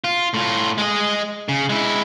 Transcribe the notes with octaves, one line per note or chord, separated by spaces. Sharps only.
F4
A2 F4
G#3 D#5
C#3
G#3 E4